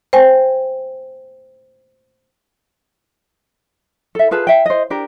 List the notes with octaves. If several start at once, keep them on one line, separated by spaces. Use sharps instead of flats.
C5 G5 G#5
A4 E5
F4 G#4 B4 A5
E5 G5
C5 D#5
D4 G4 A#4